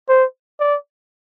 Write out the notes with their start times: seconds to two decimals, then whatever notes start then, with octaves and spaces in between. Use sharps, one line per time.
0.09 C5
0.60 D5